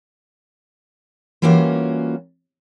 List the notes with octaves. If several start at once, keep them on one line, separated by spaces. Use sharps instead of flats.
E3 G3 A#3 C#4 F4 F#4